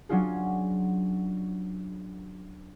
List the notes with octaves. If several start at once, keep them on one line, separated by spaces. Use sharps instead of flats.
F#3 C#4 D4 F4 G#4